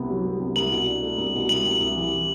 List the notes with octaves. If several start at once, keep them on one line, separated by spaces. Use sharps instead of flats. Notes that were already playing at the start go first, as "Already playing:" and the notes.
Already playing: C2 C3 B3
F#3
C2
C3
C2 F#7
B2
D4
A3
C2
B2
C2 F#7
C3
C2
E3